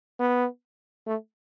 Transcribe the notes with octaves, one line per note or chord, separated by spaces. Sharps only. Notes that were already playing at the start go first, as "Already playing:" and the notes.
B3
A3